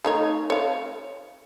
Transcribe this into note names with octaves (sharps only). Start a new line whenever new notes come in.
A3 D#4 C#5
C#5 F5